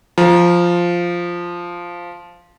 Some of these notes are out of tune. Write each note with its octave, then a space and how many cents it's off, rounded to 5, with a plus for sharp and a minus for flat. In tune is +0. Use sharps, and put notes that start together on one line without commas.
F3 +0 A#5 +20